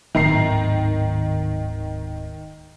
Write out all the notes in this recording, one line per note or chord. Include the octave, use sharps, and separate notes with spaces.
D1 G#2 D#3 A#5 C7